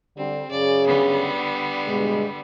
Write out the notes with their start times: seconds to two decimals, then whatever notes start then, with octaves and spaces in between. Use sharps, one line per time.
0.16 D3 G3 C4
0.50 F#2 C#3 G#4 D5
0.86 D3 G3 B3
1.88 G2 B2 G#3